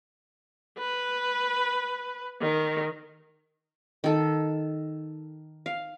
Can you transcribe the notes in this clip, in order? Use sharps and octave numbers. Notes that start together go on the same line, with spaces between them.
B4
D#3
D#3 A4
F5